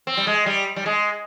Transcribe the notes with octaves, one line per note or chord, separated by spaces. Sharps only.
C4
G3
G#3
G3
G3
G#3